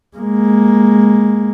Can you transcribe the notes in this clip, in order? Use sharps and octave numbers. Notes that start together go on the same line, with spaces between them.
G#3 A#3